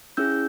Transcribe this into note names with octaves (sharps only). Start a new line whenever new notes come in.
C#4 E4 G#4 E6 G6